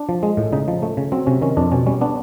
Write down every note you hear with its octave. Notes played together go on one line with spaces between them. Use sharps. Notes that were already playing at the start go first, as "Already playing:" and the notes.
Already playing: D4
F3
G#3
A2
C#3 D#4
F3
A3
C#3
F#3 C4
C3 C#4
D#3 C#4
F2 D4
B2 C#4
G3 C#4
B3 D4